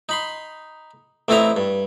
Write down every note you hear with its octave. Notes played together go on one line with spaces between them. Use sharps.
D#4 B5 C6
A1 A3 C4 E4 D#5 A#5
G2